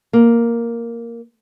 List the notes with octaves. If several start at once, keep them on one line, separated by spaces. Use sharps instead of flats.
A#3